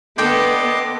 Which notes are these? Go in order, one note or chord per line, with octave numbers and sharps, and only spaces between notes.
D3 B3 A4 D#5 G5 C6 D6